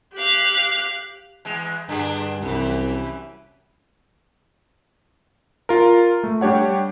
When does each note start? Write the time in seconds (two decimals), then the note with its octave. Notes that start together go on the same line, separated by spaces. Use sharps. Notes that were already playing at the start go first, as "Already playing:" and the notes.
0.15 G4 F5 F#6
1.45 E2 G#3
1.89 G2 D3 D4 G#4
2.42 C2 F#2 E3
5.69 F4 A#4
6.24 A3
6.41 G3 D4 G4 C#5 F#5